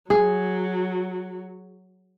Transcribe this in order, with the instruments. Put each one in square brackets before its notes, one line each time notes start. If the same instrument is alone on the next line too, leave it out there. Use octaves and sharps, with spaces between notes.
[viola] F#3 [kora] G#4